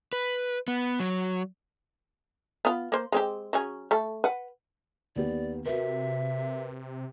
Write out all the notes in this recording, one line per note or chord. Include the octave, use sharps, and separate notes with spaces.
B4
B3
F#3
B3 F4
A#3 C5
G#3 C4 G4
F#3 C#4 G#4
A3 A4
B4 F#5
D#2 B3 G4 D5
C3 F#4 A#4 B4 E5